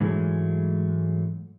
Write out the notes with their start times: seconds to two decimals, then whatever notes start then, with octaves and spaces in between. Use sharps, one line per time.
0.01 G#2 D3 E3 F#3 G#3 A3